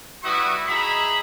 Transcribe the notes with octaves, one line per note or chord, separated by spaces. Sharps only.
G3 E4 F#4 B4 C#6 D#6
D#4 G#4 E5 A#5 B5